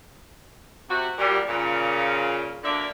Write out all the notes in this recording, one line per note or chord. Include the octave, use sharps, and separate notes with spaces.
C3 F#4
A#2 G3 F#4
A#2 C#3
D2 D3 A#3 D4 D5 E5